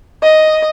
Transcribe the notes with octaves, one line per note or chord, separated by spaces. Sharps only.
D#5